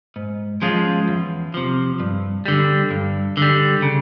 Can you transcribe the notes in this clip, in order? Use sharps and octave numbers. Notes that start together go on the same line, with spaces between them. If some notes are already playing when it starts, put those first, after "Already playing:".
G#2
F3 G#3 C#4 F4
E2
C3 F3
G2
D3 G3
G2
D3 G3
C#3